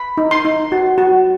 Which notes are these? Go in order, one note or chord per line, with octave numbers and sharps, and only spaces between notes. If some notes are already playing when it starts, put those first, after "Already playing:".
Already playing: B5
D#4
C6
D#4
F#4
F#4